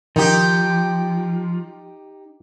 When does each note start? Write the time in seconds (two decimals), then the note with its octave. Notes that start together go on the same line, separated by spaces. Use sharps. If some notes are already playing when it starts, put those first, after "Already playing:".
0.16 D#3 F3 D#4 G4